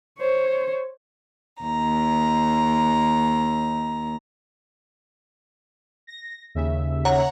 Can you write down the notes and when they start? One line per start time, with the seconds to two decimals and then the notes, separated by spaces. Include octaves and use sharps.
0.19 C5 C#5
1.62 D#2 A#5
6.07 A#6
6.55 D#2 C#3 E5
7.05 C#5 F#5 A#5